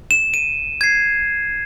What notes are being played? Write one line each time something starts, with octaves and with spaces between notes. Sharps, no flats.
E7
D#7
G#6 C7